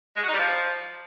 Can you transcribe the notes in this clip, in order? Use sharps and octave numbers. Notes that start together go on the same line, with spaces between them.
G#3
F#4
D#4
G3
F3